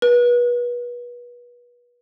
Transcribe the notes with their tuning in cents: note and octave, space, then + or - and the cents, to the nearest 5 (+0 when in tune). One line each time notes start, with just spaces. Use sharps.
B4 -35